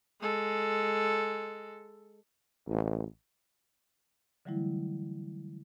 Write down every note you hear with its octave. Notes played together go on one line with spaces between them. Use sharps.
G#3 A4
A1
D3 E3 F#3 G3 A3 E4